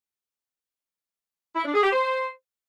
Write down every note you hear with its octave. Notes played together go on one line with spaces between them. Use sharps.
E4
D4
G#4
G4
C5